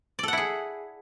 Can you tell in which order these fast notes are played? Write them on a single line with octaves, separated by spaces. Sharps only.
D5 A4 F#5 E4 G#4